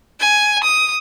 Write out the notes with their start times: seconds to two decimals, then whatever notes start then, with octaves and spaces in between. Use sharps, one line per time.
0.20 G#5
0.64 D#6